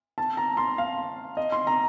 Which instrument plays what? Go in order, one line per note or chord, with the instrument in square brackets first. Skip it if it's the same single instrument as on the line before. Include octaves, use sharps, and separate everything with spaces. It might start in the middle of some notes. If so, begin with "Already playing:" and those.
[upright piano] A5
A#5
C6
F5
D#5
C6
A#5